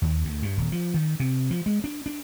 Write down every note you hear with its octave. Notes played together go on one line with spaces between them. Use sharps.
D#2
D2
G2
D#1
F3
D#3
C3
F3
G#3
D4
D4